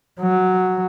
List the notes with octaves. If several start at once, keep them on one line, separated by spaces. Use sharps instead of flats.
F#3